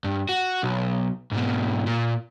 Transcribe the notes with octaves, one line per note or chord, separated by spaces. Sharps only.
G2
F#4
B1
G#2 B2
A#2